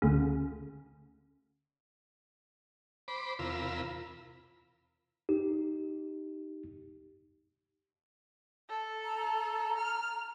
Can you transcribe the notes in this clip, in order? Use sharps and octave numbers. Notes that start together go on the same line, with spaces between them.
D2 C#3
C5 B5 D6
E2 C3 F4 A#4 B5 E6
D#4 G4
A4
A#5
F6